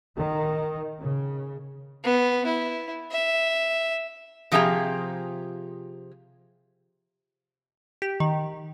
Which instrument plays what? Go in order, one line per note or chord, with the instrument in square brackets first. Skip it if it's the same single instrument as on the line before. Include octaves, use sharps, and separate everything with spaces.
[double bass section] D#3
C#3
[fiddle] B3
E4
E5
[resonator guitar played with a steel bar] C3 F3 F4 G4 G#4 A#5
[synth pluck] G4
D#3